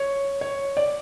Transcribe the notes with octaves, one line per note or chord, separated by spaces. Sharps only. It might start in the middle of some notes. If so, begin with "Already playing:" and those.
Already playing: C#5
C#5
D5